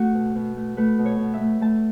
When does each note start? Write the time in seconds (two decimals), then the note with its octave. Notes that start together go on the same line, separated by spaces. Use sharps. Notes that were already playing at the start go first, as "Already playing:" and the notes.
Already playing: A3 F#4
0.14 B2
0.35 B2
0.56 A3
0.77 A3 B4
0.98 B2
1.06 C#5
1.19 B2
1.34 E5
1.40 A3
1.61 A3 A5